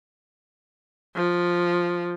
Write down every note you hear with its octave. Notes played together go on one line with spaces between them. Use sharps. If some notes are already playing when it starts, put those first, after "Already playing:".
F3